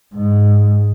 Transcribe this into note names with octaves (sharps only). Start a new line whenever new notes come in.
G#2